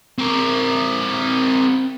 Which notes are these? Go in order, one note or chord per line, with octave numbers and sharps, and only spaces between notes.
C4 A#4